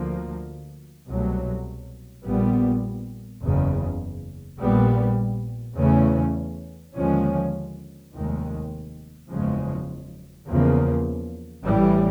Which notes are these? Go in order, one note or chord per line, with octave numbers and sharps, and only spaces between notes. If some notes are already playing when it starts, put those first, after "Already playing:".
Already playing: D2 D3 F3 A#3
C2 B2 F#3 A3
A#1 A#2 G3 B3
F#1 E2 C#3
A#1 A#2 G3 B3
E2 C#3 E3 A3 C#4
D#2 D3 F3 G#3 C#4
F1 D#2 D#3 G#3
F#1 E2 C#3 F3 G#3
E2 C#3 F3 A#3
A1 A2 E3 G3